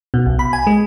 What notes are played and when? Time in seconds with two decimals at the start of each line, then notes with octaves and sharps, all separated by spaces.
0.14 B2
0.26 B1
0.39 B5
0.53 G#5
0.67 G#3